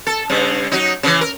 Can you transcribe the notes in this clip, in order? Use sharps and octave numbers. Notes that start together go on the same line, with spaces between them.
A4
G2 C#3
F#3 D#4
C#3 E3
A#4